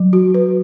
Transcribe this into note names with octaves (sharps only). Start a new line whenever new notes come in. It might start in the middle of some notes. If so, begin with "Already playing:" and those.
Already playing: F#3
F#4
B4